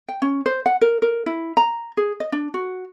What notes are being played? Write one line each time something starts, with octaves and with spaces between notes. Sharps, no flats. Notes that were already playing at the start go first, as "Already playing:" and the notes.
G5
C#4
C5
F#5
A#4
A#4
E4
A#5
G#4
D#5
D4
F#4